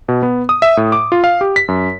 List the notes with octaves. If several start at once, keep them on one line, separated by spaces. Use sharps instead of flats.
B2
B3
D#6
E5
A2
D6
F4
F5
G4
B6
F#2